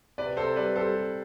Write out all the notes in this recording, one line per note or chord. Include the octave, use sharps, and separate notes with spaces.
C3 B4 D5
C3 A4 C5
G3 B4 D5
G3 A4 C5
G3